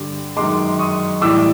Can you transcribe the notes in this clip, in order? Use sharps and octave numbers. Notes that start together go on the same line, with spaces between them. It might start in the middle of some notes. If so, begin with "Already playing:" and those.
Already playing: G2 D3 G3
F#2 D#3 G#3 C6 D6
C#6 D#6
A2 E3 G3 D6 E6